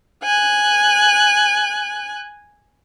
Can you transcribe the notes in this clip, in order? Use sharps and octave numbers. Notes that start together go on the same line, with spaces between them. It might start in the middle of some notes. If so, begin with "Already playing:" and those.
G#5 F#6